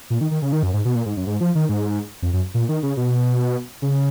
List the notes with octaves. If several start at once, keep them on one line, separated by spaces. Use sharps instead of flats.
A#2
D#3
D#3
C#3
D#3
F#2
G#2
B2
A#2
G#2
F#2
G#2
F3
D#3
G#2
F2
F#2
A#2
D#3
C#3
B2
C#3